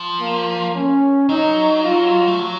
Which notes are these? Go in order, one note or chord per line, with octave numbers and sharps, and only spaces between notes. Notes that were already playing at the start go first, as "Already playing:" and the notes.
Already playing: F3
A#3
C#4
F#3 D#4
F4
A3
F#3